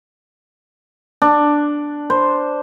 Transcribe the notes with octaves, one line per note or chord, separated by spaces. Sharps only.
D4
C5